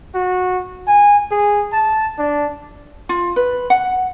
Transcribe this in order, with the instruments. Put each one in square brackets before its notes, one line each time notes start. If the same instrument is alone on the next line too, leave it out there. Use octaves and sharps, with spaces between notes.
[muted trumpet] F#4
G#5
G#4
A5
D4
[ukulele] F4
B4
F#5